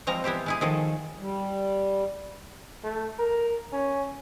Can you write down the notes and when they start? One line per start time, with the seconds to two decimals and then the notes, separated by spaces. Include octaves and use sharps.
0.07 F3 G3 G#3 C4 A#5
0.24 B3 E4 G4 C5
0.46 G#3 E4 G#4
0.61 D#3 F3 G#4 A4
1.19 G3
2.84 A3
3.19 A#4
3.73 C#4